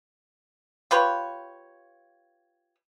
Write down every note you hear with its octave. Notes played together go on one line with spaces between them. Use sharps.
F4 G4 B4 C#5